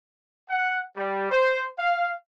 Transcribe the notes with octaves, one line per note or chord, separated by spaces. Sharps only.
F#5
G3
C5
F5